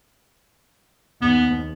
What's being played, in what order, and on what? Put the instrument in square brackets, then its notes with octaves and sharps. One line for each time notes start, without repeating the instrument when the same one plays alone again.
[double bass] D#2 [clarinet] B3